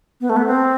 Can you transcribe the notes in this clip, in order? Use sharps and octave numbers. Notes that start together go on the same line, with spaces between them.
B3
A3
B3
C4